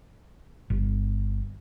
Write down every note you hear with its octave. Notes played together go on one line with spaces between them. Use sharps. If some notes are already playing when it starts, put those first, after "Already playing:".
G1